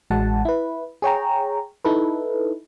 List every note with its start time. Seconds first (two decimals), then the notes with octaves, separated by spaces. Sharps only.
0.10 A1 G#3 F#4 F#5 A5
0.45 E4 B4
1.02 G#4 C#5 G5 A#5
1.85 D#4 E4 A4 B4